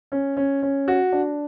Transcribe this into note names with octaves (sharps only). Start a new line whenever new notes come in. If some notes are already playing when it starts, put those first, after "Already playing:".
C#4
C#4
C#4
F#4
D4